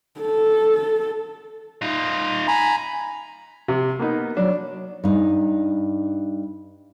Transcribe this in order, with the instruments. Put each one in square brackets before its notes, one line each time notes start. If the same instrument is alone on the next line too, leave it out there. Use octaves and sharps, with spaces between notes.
[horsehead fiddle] A4
[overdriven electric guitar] D#4 F4
[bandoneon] G#5 A#5 B5
[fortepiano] C3
A#3 B3 D#4
[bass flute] F#3 [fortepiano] D4
[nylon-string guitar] G2 D#4